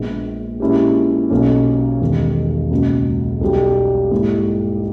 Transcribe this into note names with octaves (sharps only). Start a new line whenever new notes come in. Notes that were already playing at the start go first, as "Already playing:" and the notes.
Already playing: A#1 A#2 G#3 B3
A#2 G#3 C#4 E4 G4
B1 B2 A#3 C#4
E1 E2 D#3 G3 B3
C#2 B2 A#3
B1 B2 G3
G#2 G3 A#3 E4 G4